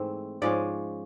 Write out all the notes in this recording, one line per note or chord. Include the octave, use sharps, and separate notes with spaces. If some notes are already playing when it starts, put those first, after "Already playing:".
Already playing: G#2 E3 A3 C4
G#2 F3 G#3 C#4 D5